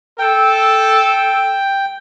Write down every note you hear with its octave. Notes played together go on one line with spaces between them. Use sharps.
A4 G5